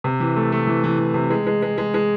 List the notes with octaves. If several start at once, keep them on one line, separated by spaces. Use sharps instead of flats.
C3
E3
A3
A3
E3
E3
E3
C3
G#3
G#3
G#3
G#3
G#3